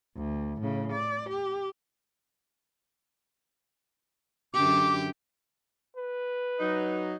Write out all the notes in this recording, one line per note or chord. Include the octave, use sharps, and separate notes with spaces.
D2
A2 C#3
D5
G4
F#2 D3 G4 D6
B4
F#3 D#4